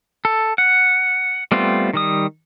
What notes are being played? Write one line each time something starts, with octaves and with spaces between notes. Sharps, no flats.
A4
F#5
G3 A3 B3 C4 F4
D#3 G3 D#6